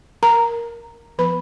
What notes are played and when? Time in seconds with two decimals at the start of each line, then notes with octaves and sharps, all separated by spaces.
0.23 A#4 A#5
1.18 F3 B3 B4 B5